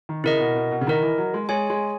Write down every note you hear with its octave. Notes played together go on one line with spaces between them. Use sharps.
D#3
C#3 E4 A#4 D#5
B2
B2
B2
C#3
D#3 E4 A#4 D#5
E3
F#3
G#3
G#3 G#4 C#5 G#5
G#3